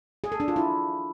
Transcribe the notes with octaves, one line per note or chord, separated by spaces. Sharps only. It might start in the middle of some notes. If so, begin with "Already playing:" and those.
G#4
A4
D4
F4
E4